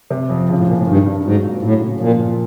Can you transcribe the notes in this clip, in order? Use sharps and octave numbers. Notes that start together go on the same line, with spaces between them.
C3
F2
C#3 F3
A2
A#2 C#3
A2
G2 D#3
G2
G#2 F#3
A#2
A2 F#3
C#3
A#2 F3
A#2